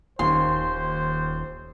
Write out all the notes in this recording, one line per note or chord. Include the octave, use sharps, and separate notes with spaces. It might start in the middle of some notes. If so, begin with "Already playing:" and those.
D#1 D#2 C5 C6